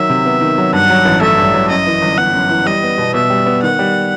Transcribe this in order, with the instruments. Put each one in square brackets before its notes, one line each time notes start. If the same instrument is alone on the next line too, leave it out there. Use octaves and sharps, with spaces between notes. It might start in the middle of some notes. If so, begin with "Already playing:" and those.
Already playing: [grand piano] D#3 F#3 [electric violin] E5
[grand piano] C3
B3
D#3
F#3
[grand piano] G2 [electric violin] F#5
[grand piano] F#3
A1
[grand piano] A3 [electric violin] E5
[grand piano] G2
F#3
[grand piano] F#2 [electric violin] D#5
[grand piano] E3
G1
[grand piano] B3 [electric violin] F#5
[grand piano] F#2
E3
[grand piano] G3 [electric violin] D#5
[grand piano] B3
B2
[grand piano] B2 [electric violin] E5
[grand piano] G3
B3
[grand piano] D#3 [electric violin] F#5
[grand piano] G3